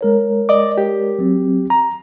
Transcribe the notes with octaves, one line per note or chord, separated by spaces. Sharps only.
G#3 A#4 C#5
D5 D#5 D6
G4
F#3 C4
A#5